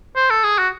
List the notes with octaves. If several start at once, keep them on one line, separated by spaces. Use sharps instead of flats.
C5
A4
G#4
F#4